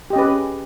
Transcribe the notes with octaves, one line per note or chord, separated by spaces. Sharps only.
C#4 G4 G#4 B4 D#5